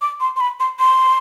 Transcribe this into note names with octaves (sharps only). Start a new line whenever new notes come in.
D6
C6
C6
B5
C6
C6